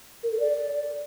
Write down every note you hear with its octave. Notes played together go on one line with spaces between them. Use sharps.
A#4
A4
D5